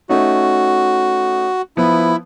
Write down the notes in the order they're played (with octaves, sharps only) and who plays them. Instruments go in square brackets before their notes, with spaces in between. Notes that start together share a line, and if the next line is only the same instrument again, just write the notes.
[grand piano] A3 C#4 D#4 [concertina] F#4
[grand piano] F3 B3 [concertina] E4